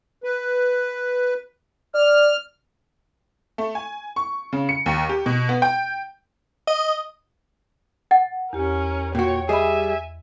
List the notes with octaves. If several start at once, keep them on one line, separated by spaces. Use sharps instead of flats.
B4
D5 F6
A3
G#5
C#6
C#3
C#7
D#2
G4
B2
B3
G5
D#5
F#5 A6
E2 C#4 G4 A#4
A#2 F#4 C#5 G5
G3 G#4 D#5 E5 G#5 B5